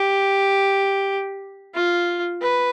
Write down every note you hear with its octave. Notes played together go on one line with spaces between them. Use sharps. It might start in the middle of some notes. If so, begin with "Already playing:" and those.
Already playing: G4
F4
B4